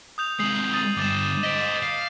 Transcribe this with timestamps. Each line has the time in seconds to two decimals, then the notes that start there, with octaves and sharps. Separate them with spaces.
0.18 D#6 G6 F7
0.39 C3 G#3 D#6 C7 F#7
0.73 D#6 A6 D#7
0.97 G2 D3 D6 A6 E7
1.43 C5 D#5 B6 D7
1.83 F5